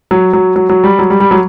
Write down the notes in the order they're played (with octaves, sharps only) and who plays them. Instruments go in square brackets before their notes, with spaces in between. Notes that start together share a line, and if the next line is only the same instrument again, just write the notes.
[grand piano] F#3
F#3
F#3
F#3
G3
F#3
G3
G3
F#3